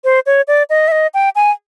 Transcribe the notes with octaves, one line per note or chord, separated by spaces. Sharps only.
C5
C#5
D5
D#5
E5
D#5
G5
G#5